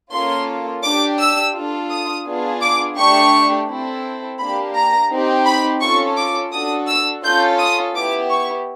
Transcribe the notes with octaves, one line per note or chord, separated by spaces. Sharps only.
A#3 C#4 F4 A4 C6
D4 G4 D6
E6
D4 F4 A4
D#6
B3 D4 F4 G#4
D6
A3 D4 G4 C#6
C4 E4 A4
A#3 D4 G4 B5
A#5
C4 D#4 G4
B5
C#4 F4 A4 C#6
D6
D4 F#4 A4 D#6
E6
C#4 F4 A4 G6
D#6
B3 E4 G4 D6
C#6